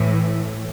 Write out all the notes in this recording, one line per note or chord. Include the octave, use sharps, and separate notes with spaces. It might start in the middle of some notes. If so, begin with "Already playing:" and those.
Already playing: A2 E3